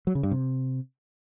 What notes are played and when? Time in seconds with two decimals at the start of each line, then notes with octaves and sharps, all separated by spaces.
0.07 F#3
0.15 C#3
0.23 G2
0.32 C3